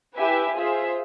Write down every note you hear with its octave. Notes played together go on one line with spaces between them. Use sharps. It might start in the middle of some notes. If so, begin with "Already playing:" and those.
E4 G4 B4 E5 G#5
F4 G#4 C5 E5